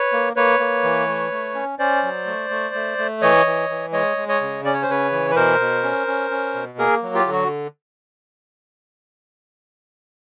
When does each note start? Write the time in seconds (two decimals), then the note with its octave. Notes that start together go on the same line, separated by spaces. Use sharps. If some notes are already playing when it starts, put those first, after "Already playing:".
Already playing: B4 C#5
0.13 A#3
0.36 A#3 B4 C#5
0.59 A#3
0.83 E3
1.07 A3
1.31 A3
1.55 C#4
1.79 C#4 C5 D5
2.03 F#3
2.26 A3
2.50 A3
2.75 A3
2.98 A3
3.22 E3 C#5 D#5
3.46 E3
3.69 E3
3.92 G#3 C#5 D#5
4.17 G#3
4.28 C#5 D#5
4.41 C#3
4.65 C#4 D5
4.73 C#5
4.82 C5
4.89 C#3 B4 C#5
5.12 E3
5.31 B4
5.35 B2 A#4 C5
5.60 B2
5.83 C#4
6.07 C#4
6.31 C#4
6.54 B2
6.78 A#3 G#4 A#4
7.02 F#3
7.14 F4 G4
7.26 D3
7.32 F#4